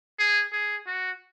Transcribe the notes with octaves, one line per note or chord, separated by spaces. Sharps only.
G#4
G#4
F#4